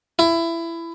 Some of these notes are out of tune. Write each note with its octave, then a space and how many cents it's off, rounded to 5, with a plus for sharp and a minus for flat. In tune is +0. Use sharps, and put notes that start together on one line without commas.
E4 +20